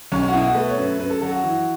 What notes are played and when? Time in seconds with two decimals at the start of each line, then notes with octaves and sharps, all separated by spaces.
0.12 B1 C#4
0.23 C#4
0.28 F#4
0.33 B2 E4
0.44 F#4
0.55 A3 B4
0.68 C#5
0.78 F#2 B4
0.99 F#2 B4
1.10 A4
1.21 F#3 A4
1.32 F#4
1.44 E3